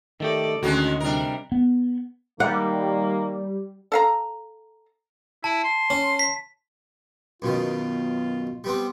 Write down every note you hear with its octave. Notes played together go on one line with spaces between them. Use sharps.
D#3 A3 G4 A4 D5 D#5
D2 D#3 G#3 C#4 F#4
C3 G3 D4 A#4
B3
D#3 G3 A#3 F#5
A4 F5 A#5
E4 A5
C6
C#4
B6
F#2 B2 D#3 F4
G3 B3 C4